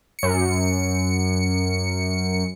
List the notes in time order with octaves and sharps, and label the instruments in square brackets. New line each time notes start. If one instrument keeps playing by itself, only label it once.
[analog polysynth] F#2 C#7